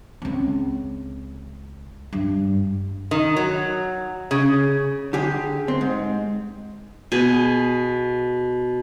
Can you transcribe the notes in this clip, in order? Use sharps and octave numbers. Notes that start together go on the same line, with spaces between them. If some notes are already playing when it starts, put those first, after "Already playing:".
C#2 C4
G2
D#3
F#3
C#3
D3 G4 G#4
C4
G#2
B2 G#4